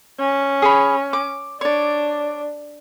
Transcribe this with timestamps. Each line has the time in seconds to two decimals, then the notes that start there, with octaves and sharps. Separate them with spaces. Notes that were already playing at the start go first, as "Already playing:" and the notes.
0.19 C#4
0.62 G#4 C#5 B5
1.13 D6
1.61 D4 C#5 D5